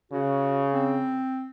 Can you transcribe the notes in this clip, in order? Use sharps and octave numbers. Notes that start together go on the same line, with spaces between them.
C#3 F#4
C4